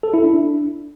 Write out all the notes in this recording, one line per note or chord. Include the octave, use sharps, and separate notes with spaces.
A4
E4
D4